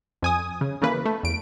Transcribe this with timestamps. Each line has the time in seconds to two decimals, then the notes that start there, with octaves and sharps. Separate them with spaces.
0.22 F2 G#5 D#6
0.61 C#3
0.82 C#3 E3 A#3 B4
1.06 A3
1.23 E2 D7